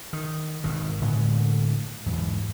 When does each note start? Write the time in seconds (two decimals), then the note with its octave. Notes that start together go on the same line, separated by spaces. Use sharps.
0.13 D#3
0.64 G#1 B2 D#3
1.01 A2 D3 G#3 B3
2.06 E2 G#2 B2